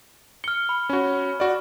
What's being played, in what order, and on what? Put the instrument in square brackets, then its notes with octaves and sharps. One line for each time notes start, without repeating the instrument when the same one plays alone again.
[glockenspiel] F6 G7 [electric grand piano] C#7
[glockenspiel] B5
[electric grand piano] C#4 F#4
F#4 D5